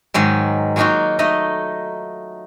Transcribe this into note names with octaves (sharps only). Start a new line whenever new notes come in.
G#2 D#3 F#3 G#3
F#3 G#3 A#3 D#4 F4 F#4
A3 D#4 D#5